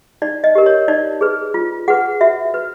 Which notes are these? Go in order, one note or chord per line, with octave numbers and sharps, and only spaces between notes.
D#4 D5
D#5
G4 A#4
C#5
D#4 D5
G#4 B4
F4
G#4 B4 F#5
F#4 E5
B4